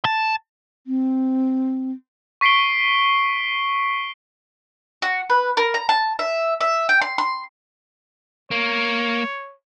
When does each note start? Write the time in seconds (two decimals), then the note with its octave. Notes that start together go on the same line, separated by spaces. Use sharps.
0.05 A5
0.87 C4
2.41 C#6 B6 C7 D7 G7
5.02 F#4
5.30 B4
5.57 A#4
5.74 A#5
5.89 A5
6.19 E5
6.61 E5
6.89 G5
7.01 C6
7.18 C6
8.51 A#3 C#5